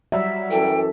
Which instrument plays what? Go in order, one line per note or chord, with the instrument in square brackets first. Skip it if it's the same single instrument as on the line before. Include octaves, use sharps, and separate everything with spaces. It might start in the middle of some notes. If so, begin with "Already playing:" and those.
[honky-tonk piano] F#3 G3 [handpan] E5
[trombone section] F#2 E3 A4 [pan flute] G5